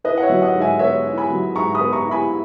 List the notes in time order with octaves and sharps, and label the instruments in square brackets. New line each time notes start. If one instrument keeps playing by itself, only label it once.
[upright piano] E4 B4 D#5
F#5
C#5 E5
F#3
D#5 F#5
G#2
E5 G#5
B3 C#5 E5
E4
G#5 B5
F#3
G#2 A#5 C#6
B5 D#6
B3
A#5 C#6
E4
G#5 B5